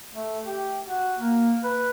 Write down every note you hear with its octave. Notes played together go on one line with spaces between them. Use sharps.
A3
G4
F#4
A#3
B4